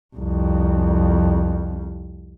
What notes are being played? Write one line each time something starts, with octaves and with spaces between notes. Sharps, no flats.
C2 F2